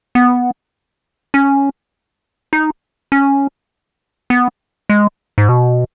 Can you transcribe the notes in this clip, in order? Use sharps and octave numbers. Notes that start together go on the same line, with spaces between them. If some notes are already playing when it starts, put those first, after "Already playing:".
B3
C#4
D#4
C#4
B3
G#3
G#2
B2